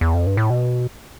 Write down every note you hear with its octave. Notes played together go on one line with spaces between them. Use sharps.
E2
F2
G2
A2
B2